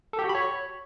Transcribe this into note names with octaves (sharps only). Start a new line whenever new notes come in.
A4
G4
F#4
B5
C#5